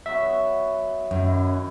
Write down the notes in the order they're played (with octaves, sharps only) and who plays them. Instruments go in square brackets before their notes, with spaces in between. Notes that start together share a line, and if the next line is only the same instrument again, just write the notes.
[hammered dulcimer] F#3 B3 C#6 [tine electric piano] E5
[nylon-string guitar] F#2 [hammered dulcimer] D#3 E4